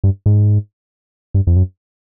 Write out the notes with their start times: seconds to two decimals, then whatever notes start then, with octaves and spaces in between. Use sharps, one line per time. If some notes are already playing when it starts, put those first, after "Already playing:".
0.04 G2
0.26 G#2
1.34 G2
1.47 F2
1.56 F#2